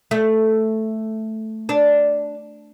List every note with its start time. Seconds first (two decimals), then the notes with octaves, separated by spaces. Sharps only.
0.11 A3
1.69 D4